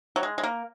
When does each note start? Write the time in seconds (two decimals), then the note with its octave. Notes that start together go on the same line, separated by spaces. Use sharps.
0.16 F#3
0.23 G#3
0.38 G#3
0.43 A#3